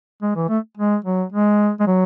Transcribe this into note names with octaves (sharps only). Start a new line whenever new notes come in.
G#3
E3
A3
G#3
F#3
G#3
G#3
F#3